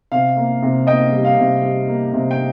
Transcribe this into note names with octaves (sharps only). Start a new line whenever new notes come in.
C3 F5
A#3
C3
A#3 D#5 G5
G3
F5
C3
G3
A#3
C3
G5